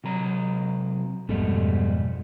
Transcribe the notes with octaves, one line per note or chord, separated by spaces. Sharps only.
C3 F#3 A#5
F2 G#2 B2 G3 A3